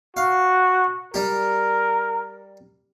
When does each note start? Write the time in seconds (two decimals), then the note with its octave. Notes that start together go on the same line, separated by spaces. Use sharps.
0.17 F#4 F5
1.14 G3 G4 A#4